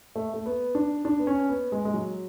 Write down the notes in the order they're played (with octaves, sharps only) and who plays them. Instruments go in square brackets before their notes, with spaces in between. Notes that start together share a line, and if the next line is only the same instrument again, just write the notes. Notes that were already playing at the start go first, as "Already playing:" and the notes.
[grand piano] A3
A3
B3
D4
D4
B3
C#4
B3
G#3
G#3
F#3